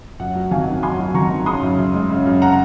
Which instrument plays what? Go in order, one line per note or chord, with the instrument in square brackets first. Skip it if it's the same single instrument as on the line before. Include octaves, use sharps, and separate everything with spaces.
[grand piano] F#2 F#5
F#3
G#1 F5 G#5
D#3
F#2 G#5 C6
F#3
G#1 A#5 C#6
D#3
C#3 C6 D#6
F#2
F#2
G#3
C#3
F#2
F#5 A#5